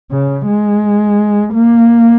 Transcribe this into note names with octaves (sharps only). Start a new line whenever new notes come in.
C#3
G#3
A#3